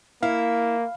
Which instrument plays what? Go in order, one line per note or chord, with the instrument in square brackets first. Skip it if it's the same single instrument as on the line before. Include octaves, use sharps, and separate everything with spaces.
[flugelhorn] A#3 [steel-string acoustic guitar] E4 [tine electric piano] F5